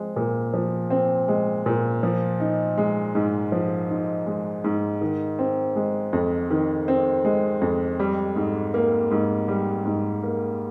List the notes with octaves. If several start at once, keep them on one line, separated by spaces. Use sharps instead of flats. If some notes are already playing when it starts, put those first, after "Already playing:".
Already playing: F3 G#3 C4
A#2
F3
C4
G#3
A#2
F3
D#4
G#3
G#2
F3
D#4
G#3
G#2
D#3
C4
G#3
F2
D#3
C4
G#3
F2
G3
G#2
A#3
G#2
G3
G#2
A#3